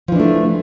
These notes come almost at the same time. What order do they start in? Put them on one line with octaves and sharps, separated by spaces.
F3 E3 D4 A3